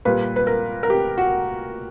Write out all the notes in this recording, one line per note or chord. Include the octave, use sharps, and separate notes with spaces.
A#2 G3 B4
B4
A#4
A#4
G4
F#4